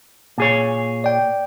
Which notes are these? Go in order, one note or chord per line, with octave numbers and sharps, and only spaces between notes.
A#2 G#4 C#5
D5 G5